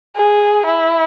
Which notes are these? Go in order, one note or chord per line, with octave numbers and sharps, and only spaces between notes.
G#4
E4